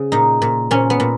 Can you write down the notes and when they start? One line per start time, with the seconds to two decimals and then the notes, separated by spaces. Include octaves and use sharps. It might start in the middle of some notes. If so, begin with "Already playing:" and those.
Already playing: C#3
0.12 A#2 D#4
0.42 A#2
0.71 A#2 C#4
0.90 B3
1.00 A#2